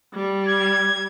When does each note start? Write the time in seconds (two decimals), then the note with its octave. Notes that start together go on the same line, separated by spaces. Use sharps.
0.14 G3
0.48 G#6